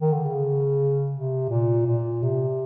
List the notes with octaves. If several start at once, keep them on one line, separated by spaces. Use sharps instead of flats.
D#3
D3
C#3
C3
A#2
A#2
C3